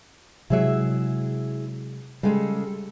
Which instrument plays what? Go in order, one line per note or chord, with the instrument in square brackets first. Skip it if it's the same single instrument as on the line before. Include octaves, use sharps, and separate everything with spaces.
[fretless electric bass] C3 F#3 G#3 [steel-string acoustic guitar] E4 G#4 E5
[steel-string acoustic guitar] C#3 G#3 A4 [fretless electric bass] G3